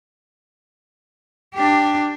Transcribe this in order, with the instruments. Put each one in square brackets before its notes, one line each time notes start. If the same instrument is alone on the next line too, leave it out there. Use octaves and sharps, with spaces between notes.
[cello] D4 G4